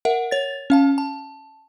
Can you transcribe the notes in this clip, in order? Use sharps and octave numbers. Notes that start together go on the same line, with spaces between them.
A#4 E5 F#5
C#5 A6
C#4 F5 A5
A5